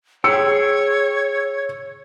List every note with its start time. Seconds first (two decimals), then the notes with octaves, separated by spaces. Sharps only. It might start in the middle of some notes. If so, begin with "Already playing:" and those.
0.24 G#4 C#5 G5 E6 C#7